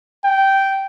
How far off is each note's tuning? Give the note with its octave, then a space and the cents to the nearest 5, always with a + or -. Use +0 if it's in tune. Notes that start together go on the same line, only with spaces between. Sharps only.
G5 -10